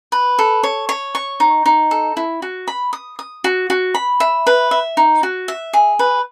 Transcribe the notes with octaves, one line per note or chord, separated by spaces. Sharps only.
B4
A4
C#5
C#5
C#6
D#4
D#4
A4
E4
F#4
B5
D#6
D#6
F#4
F#4
B5
E5
B4
E5
D#4
F#4
E5
G#4
B4